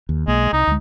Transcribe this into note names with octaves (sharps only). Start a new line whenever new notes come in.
D#2
B1 G#3 A#3
C2 D#4
D2 G#3